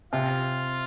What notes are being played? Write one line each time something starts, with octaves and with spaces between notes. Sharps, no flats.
C3 F4